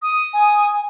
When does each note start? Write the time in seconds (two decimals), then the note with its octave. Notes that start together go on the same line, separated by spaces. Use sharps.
0.02 D#6
0.33 G#5